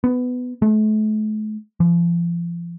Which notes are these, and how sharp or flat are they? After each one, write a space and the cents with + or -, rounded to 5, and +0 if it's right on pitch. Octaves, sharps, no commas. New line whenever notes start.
B3 +15
A3 -40
F3 -35